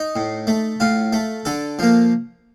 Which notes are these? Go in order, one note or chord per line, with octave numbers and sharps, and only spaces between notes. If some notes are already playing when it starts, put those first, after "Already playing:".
Already playing: D#4
A2
A3
A2 F4
A3
D3 A4
F3 A#3